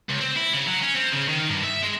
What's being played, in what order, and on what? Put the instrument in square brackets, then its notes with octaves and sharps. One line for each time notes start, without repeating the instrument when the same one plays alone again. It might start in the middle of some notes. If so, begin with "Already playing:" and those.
[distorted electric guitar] C#2
C4
E4
C#3
F#3
C#4
C4
C#3
D#3
G2
E5
G#3